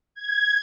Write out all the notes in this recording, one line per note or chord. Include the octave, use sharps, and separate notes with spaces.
G#6